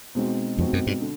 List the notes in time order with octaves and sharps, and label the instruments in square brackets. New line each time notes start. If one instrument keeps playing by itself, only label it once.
[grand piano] B2 G#3 C4 D#4 F#4
[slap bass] F2 [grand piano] B2 G#3 C4 D#4 F#4
[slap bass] F#2
G2
[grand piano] D3